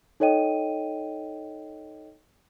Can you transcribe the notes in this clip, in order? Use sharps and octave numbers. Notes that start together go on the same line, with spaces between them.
D#4 A4 C#5 D#5 G5 D#7